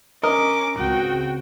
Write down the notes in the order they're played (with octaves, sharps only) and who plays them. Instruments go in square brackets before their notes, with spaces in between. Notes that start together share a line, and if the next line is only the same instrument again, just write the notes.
[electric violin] C#4 D6 [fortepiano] A#4 D#5
[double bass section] C#2 C#3 C4 [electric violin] F#4 G5